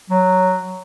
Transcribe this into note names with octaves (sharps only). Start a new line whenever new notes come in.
F#3